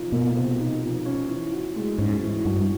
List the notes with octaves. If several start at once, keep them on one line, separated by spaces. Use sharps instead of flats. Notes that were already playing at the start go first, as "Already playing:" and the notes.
Already playing: C3 F3 D#4
B2 A#3
C3
D#4
F3
C#4
E3
F#4
G#3
G#2 C#4
E3
G2 F#4